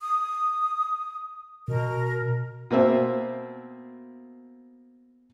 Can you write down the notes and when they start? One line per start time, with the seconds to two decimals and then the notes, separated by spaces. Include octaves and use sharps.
0.01 D#6
1.68 B2 A#4
2.71 B2 A#3 C4 E5